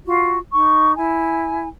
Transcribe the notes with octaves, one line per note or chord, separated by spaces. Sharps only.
F4 F#4
D#4 C#6
E4 G#5